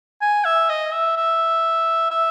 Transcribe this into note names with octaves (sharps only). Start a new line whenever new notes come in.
G#5
E5
D#5
E5
E5
E5